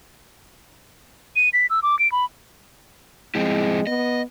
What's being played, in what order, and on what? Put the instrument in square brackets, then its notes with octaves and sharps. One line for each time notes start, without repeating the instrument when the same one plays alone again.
[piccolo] D#7
B6
E6
D6
D7
B5
[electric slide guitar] F3 C4 E4 [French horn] G#3
[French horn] B3 [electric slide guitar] D#5